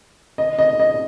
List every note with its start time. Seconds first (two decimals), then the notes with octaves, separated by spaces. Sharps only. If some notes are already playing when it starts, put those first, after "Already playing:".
0.38 D#5
0.59 D#5
0.80 D#5